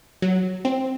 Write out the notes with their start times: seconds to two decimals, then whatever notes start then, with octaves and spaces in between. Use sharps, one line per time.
0.22 F#3
0.65 C4